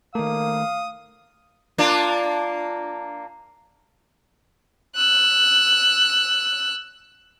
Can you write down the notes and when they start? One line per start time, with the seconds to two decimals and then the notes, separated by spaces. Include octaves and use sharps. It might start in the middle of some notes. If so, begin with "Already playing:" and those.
0.15 D#3 A3 A#3 F5 D#6
1.78 A#3 D4 F4
4.96 E6 F#6